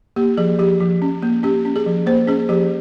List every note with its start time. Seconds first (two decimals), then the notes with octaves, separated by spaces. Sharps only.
0.16 A#3 G4
0.37 F3 G#4
0.59 F3 G4
0.80 F3
1.02 C#4
1.22 A#3
1.43 C#4 G4
1.65 C#4
1.76 G#4
1.86 F3
2.06 A#3 C5
2.27 C#4 G#4
2.49 F3 G4